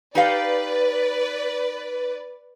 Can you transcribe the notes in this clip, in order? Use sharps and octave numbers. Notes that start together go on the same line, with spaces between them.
D#4 G4 B4 D5 F5